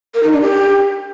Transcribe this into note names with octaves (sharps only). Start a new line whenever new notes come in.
A#4
D#4
D4
G4